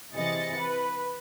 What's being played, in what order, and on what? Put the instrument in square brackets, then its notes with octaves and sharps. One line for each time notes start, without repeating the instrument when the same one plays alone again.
[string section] C3 E3 G#4 D#5 A6 C#7
B4 B5